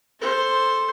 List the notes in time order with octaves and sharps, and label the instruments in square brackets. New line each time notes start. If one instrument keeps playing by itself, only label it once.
[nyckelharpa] A4 C5